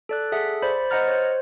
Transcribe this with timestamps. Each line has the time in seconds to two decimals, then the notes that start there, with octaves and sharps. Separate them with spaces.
0.09 A4 D5 F#6
0.32 G#4 A4 E5 F#5
0.62 C5 D5 B5
0.90 C5 D#5 F#5 A#5 F6 A6
1.08 C5 C#5